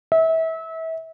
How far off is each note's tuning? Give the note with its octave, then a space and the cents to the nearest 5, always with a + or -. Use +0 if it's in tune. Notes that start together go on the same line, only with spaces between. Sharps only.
E5 -30